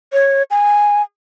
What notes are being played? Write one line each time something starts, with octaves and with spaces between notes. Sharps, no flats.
C#5
G#5